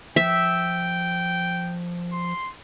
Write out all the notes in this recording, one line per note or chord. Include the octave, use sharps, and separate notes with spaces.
F3 E5 G5
C6